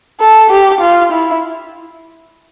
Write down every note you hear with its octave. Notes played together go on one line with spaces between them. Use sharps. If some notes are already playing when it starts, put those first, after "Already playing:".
A4
G4
F4
E4